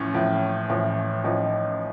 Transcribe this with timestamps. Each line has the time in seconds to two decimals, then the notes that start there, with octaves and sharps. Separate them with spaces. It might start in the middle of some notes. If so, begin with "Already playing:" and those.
Already playing: A1 A2 F3 C#4
0.14 A1 A2 F3
0.69 A1 A2 F3
1.24 A1 A2 F3 D#4